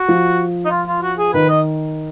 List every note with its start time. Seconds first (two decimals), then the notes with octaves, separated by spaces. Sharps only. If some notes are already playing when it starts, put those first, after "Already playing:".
Already playing: F#4
0.08 F3
0.65 D#4
0.71 F4
0.87 F4
1.02 F#4
1.18 G#4
1.34 D#3 B4
1.49 D#5